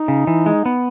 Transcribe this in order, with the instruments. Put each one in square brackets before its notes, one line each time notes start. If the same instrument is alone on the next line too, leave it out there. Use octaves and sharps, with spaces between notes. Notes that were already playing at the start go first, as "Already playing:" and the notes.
Already playing: [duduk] D#4
[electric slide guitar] C#3
E3
G#3
B3